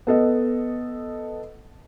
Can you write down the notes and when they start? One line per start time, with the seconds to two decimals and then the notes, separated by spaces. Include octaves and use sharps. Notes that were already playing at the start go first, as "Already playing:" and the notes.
0.07 B3 A4 D#5